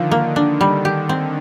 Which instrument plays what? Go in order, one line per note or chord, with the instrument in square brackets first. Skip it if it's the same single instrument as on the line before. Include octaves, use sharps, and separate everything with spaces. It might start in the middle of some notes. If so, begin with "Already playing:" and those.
Already playing: [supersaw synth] D3 D#3 [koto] F3 F4
[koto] A#3
D4
G3
G4
C4